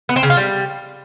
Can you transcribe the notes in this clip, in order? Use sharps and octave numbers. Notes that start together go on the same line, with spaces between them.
B3
C4
C#3
F4
G3